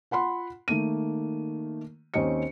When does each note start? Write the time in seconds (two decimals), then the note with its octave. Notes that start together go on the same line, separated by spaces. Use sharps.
0.11 F4 F#5 B5 C6
0.68 D#3 A3 A#3 D#7
2.14 D#2 C4 C#4 D#5 C#7